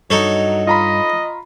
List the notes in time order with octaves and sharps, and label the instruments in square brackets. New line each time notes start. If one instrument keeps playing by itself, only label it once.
[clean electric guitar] G2 [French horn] F#3 [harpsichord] D#4 A4 C#5
[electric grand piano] F4 A#5 B5 [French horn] D#5